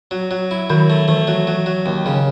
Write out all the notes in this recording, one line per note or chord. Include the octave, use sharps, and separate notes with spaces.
F#3
F#3
E4
D#3 F#3
A3
E3 A3
F#3
F#3
F#3
D#2
C#3